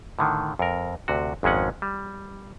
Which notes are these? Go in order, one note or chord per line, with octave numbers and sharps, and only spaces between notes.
A2 D3 D#3
F2 A#4
D2 C3 F#4
G#1 F2 G#3 C#4 F#5
G3